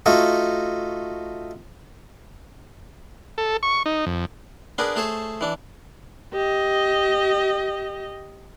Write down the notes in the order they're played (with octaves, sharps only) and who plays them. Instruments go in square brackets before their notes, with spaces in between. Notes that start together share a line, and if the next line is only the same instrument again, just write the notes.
[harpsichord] A3 D#4 F4 F#4
[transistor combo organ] A4
C#6
D#4
F2
[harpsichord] B3 D4 G#4 A#4 B4
A3 G#4 A4 C5 C#5
E3 D4
[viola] G4 D#5